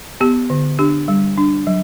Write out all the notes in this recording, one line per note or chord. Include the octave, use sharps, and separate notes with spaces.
B3 G4
D3
D4 G4
G3
D4
F#3